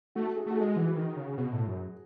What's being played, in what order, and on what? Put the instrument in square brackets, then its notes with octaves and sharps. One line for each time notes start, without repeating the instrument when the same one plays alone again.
[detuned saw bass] A3 [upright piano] F#4
[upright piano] G#4
[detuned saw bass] A3 [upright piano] F#4
[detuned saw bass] G#3 [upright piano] G#4
[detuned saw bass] E3 [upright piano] F#4
[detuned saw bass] D#3
C#3
B2
A2
F#2